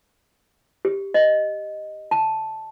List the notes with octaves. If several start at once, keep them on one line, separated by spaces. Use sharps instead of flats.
G4
D#5
A5